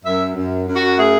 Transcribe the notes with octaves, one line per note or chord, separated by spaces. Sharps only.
F#2 E5
F#2
F#2
F#4
A3 G#4